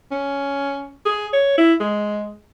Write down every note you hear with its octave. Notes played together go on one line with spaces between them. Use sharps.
C#4
G#4
C#5
E4
G#3